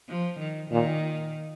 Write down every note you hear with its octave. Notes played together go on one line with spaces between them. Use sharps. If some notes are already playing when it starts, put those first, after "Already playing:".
F3
D#3
A#2 D#3